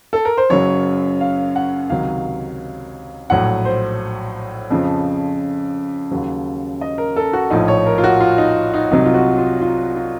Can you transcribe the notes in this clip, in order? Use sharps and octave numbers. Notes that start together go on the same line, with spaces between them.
A4
A#4
C5
F#1 F#2 C#3 F#3 C#5
F5
F#5
C#2 C3 D#3 F#3 F5
A#1 A2 F#3 F#5
C5
F2 C#3 F3
D#2 C#3 F#3
D#5
A#4
A4
F#4
A#1 A2 F3 D#4
C#5
A#4
F4
F#4
F4
D#4
D#4
C2 C3 F#3 D#4
F4
F#4
F4
F4
F4